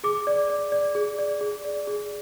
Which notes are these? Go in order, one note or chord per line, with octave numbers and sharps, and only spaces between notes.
G#4 D6
D5
D5
D5
G#4
D5
G#4
D5
G#4